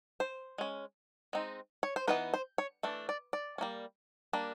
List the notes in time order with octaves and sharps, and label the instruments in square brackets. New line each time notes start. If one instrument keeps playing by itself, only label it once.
[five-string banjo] C5
G#3 C#4
G#3 C4 D#4
C#5
C5
E3 G3 B3 D#4 B4
C5
C#5
E3 A3 D4
D5
D5
C#4
G3 A#3
G3 A#3 D4